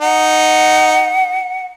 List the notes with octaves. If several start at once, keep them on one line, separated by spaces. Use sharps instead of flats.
D#4 F#5